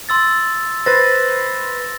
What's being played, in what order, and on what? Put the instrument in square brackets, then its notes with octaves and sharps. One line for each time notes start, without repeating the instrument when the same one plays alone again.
[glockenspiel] C6 E6 A6
[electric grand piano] B4 C5 [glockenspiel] A6 A#6